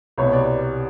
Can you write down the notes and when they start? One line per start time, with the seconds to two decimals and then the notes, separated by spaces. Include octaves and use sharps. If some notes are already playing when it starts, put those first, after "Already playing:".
0.18 C2 B2 C#5
0.33 D5